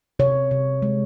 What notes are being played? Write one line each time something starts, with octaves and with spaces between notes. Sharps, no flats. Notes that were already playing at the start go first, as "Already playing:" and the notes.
C3 C#5
C3
G#3